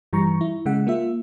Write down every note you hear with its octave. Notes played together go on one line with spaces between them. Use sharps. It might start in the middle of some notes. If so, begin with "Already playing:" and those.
G2 E3 G3 A#5 C#6
E4
C#3 G#3 F#5
A#3 F4 E5